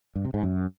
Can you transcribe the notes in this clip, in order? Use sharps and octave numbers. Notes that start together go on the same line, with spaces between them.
G2
C3
G#2
F#2